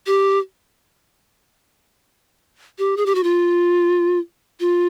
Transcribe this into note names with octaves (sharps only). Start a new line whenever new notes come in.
G4
G4
G#4
G4
F#4
F4
F4